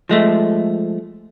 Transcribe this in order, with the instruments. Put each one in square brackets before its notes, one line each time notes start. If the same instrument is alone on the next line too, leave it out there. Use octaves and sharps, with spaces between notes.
[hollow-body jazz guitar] F3 G#3 A3